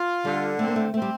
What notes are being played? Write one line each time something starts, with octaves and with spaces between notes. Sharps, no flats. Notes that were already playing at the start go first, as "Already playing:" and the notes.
Already playing: F4
D3 G3
A3 C4
A#3
A3
A3 C4
G3